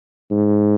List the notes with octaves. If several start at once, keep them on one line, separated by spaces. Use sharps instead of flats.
G#2